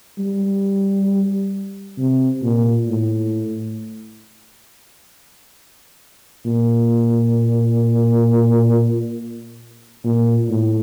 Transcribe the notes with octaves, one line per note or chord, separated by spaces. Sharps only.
G3
C3
A#2
A2
A#2
A#2
A2